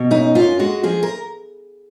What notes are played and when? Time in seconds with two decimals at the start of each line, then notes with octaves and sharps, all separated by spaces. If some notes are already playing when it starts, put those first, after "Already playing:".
Already playing: B2
0.11 F#2 D#4
0.35 F#2 F4
0.59 G#3 F#4
0.83 F3 G#4
1.03 A#4